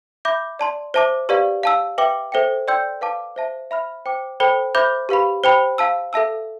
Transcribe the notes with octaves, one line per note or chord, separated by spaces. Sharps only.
E5 B5 D6 G6
D5 A5 C6
C5 E5 A5 D6
G4 B4 D5 F5
F5 A5 E6
B4 E5 G5 D6
A4 C5 E5 G5
D5 G5 C6 E6 G6
B4 F5 A5 D6
C5 E5 A5
E5 B5 F6
C5 G5 D6
A4 C5 G5 B5
C5 E5 B5 D6 G6
G4 B4 F5 B5
C5 G5 B5
F5 A5 E6
A4 E5 A5 E6